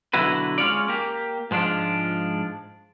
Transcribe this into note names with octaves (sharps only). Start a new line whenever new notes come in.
B2 D3 F#3 E4 F#4 B4
G#3 C#4 F4 C#5 D5
A#3 G4
G#2 F3 G#3 D4 F4